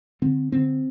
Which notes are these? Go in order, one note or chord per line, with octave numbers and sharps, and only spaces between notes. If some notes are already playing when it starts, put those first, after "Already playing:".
D3 C4
D3 C4